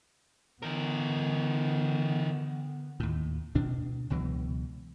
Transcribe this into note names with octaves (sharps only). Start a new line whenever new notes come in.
D3 E3 B3 A#4
D#2 A2
D2 B2 D4
C#2 B2 E3 F#3